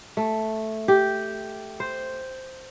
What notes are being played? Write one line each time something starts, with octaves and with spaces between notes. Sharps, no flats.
A3
G4
C5